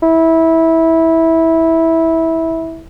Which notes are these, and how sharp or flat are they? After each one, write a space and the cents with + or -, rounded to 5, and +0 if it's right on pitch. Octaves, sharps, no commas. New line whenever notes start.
E4 -15